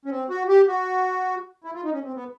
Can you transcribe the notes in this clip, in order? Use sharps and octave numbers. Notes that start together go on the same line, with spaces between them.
C#4
C4
F#4
G4
F#4
E4
F4
D#4
C#4
C4
B3